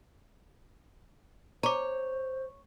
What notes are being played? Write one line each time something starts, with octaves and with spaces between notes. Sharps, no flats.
C5 C#5 A#5 D6